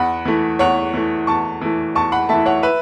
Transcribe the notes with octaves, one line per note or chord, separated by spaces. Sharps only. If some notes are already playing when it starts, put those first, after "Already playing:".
Already playing: E2 F#5 B5
E3 A3
E2 C#5 F#5
E3 A3
E2 A5 C#6
E3 A3
E2 A5 C#6
F#5 B5
E3 A3 E5 A5
C#5 F#5
B4 E5